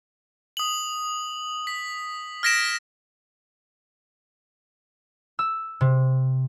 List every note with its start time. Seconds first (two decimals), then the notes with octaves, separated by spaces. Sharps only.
0.57 D#6 F#7
1.67 B6
2.43 F6 G#6 A#6 B6 D7 E7
5.39 E6
5.81 C3